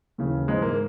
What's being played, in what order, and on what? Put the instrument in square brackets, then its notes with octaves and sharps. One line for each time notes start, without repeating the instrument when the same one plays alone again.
[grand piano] D#2 C#3 E3
G#2 E3 G#3
A#3